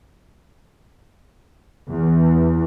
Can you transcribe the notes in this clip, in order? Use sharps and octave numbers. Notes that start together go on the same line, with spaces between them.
E2